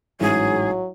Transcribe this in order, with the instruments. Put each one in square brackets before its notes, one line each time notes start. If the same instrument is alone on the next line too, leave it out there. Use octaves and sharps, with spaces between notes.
[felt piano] A1 G#2 [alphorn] F#3 [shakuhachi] G#4